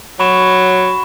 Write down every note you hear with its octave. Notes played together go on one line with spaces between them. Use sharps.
F#3 B5 C#6 E7